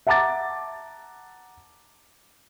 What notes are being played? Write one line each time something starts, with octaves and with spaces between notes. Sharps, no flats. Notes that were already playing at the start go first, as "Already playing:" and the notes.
E5 F#5 A5 A#5 D6 A6